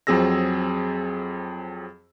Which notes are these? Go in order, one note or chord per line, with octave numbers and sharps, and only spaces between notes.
F2 F#3 C4 G#4 E6 A#6